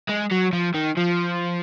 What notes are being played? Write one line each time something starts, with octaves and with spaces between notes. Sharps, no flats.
G#3
F#3
F3
D#3
F3